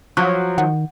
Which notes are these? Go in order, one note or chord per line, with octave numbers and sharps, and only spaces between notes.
F3 F#3 C#6 F#6
D#3 F#5